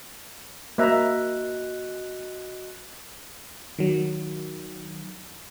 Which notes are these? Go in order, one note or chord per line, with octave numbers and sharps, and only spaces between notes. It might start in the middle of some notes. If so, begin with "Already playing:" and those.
A#3 F#4 D#5 E5 A#5 F#6
D#3 F#3